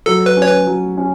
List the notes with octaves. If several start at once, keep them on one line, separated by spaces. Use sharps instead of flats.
F#3 A4
B4
C#4
C#5
B4
F#3
C#4